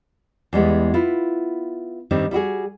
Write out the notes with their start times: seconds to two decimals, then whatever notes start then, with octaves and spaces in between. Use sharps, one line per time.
0.53 E2 G3 G#3 B3
0.94 B3 E4 F4
2.11 G2 D#3 G3 C4
2.31 G3 E4 F#4 G#4